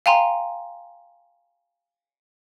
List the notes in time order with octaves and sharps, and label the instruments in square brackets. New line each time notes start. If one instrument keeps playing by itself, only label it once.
[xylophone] F5 G5 G#5 A#5 C6